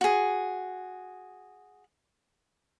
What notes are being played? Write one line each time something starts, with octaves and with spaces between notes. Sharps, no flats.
F#4 G#4